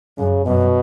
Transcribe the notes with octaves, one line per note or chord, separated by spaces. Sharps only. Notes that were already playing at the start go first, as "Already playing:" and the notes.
F#2 C#3
F#2 B2